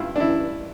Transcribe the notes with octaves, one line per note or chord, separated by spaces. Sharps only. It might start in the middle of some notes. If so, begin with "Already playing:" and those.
Already playing: G2 E4 F4
D4
E3 E4